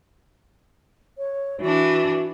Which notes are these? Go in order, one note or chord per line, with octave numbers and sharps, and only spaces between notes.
C#5
E3 D4 F#4